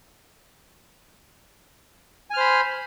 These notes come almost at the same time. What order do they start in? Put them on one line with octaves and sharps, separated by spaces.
G#5 F6 C5 B5